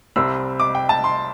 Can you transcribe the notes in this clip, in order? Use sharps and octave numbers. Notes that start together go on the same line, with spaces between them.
C2 C3 G3 C4 E6
D6
G5
A5
C6